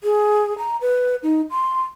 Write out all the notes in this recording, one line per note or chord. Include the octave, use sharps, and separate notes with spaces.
G#4
A#5
B4
D#4
C6